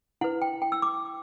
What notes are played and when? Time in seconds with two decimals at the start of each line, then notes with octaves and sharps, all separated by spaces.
0.21 E4 B4 F#5
0.42 G5
0.62 G5
0.72 E6
0.82 D6